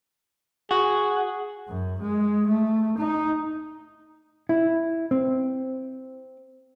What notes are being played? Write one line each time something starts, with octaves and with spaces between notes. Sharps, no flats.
F#4 G#4
F#2
G#3
A3
D#4
E4
C4